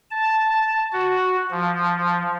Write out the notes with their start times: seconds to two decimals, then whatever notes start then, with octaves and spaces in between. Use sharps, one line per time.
0.11 A5
0.92 F#4
1.51 F3